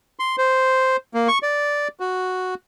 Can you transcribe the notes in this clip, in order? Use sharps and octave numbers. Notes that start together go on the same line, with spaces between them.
C6
C5
A#3
C#6
D5
F#4